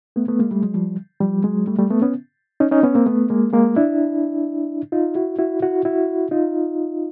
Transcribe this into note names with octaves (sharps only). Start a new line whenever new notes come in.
A3 B3
A3 B3
G#3 A#3
G3 A3
F#3 G#3
F3 G3
F3 G3
F#3 G#3
G3 A3
G3 A3
A3 B3
B3 C#4
C#4 D#4
C#4 D#4
B3 C#4
A#3 C4
A3 B3
G#3 A#3
G#3 A#3
D4 E4
D#4 F4
E4 F#4
E4 F#4
E4 F#4
E4 F#4
D#4 F4